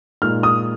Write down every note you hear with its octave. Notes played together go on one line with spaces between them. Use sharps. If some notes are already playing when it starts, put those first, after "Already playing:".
A#2 G#3 D#4 F6
D#6